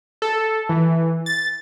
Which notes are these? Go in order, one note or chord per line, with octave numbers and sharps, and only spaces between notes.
A4
E3
A6